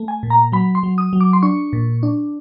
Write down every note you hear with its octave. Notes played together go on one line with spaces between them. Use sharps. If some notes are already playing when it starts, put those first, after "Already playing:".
Already playing: A3
G#5
A#2
A#5
F#3 B5
C6
F#3
D#6
F#3
D6
C6
D4 C#6
A#2
D4